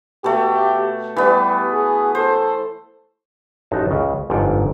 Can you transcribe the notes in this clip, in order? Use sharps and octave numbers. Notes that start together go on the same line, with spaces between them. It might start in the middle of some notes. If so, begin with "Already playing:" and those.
B2 A3 G4
E3 G3 B3
G#4
A4 C5
A1 F#2 D#4 F#4 A5
C#2 C#3 E5
G1 F2 G#2 F4 F#5 G5